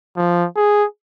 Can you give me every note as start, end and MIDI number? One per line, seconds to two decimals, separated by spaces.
0.17 0.46 53
0.56 0.85 68